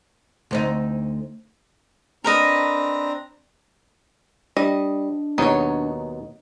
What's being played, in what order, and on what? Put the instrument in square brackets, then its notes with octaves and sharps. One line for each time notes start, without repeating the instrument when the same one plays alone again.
[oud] D2 C4 D#4
[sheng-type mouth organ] C4 D4 A#5 [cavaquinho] A#4 B4 D#5
[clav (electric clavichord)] G3 [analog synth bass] D4 [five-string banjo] D#5
[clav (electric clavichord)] D#2 B2 F#3 [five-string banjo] D#4 C#5